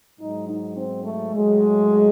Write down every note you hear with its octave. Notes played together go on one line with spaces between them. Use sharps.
G#2 F#3 D#4
D#4
C4
A3
A2 F#3 G#3